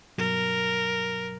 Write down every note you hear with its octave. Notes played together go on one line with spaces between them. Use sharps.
G2 B2 F#3 A#4